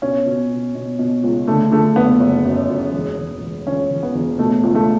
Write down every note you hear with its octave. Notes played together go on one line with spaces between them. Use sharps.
B2 C#4
B2
B2
B2
B2
C#2
D3 A3
D3 A3
F#1 B3
F#1
F#2
F#2
E1
E1
E1
E1 C#4
E1
B3
E1
B2 A3
C#2
A3